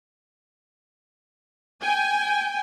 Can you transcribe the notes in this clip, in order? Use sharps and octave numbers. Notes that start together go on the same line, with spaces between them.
G5 G#5